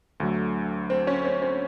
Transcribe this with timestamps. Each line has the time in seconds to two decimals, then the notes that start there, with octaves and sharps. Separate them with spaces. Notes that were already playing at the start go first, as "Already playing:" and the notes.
0.20 D2 D3 F#3 A3
0.90 C4
1.07 C#4
1.25 C4
1.42 C4